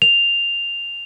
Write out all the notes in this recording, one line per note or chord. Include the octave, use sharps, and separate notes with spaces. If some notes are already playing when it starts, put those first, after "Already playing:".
F7